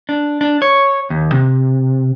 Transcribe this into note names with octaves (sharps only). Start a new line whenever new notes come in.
D4
D4
C#5
D#2
C3